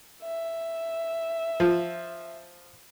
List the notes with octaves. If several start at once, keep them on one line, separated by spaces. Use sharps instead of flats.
E5
F3